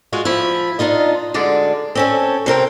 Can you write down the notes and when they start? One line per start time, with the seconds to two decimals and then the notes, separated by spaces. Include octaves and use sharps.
0.13 G#3 F4 F#4
0.25 F3 E4
0.79 D4 D#4 F4 D#5
1.34 D2 D3 G#3 D5
1.95 C4 C#4 A4
2.46 C3 C4 A#4 G5